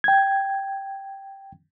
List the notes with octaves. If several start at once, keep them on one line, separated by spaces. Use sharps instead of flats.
G5 G#6